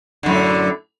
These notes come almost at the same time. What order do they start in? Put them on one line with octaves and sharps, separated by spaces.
D3 F#2 A2